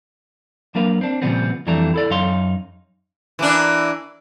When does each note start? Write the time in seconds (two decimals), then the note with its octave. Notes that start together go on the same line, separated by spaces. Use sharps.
0.75 F#3 A#3 D4 A#4 B4 F5
1.01 C4 D4
1.22 A#2 C#3 F3 G3 B3 C4
1.67 F2 E3 G3 A3 D4 A#5
1.94 E4 A4 D5
2.10 F#2 D#4 C#5 F5 C6
3.39 E3 A#3 D4